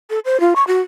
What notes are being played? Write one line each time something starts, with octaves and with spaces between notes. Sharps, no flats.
A4
C5
F4
C#6
F#4